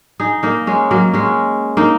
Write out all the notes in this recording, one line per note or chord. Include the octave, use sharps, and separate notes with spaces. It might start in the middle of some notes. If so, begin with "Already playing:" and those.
D#4 G#4
A#3 D#4
G#3 C#4
F#3 A#3
G#3 C#4
A#3 D#4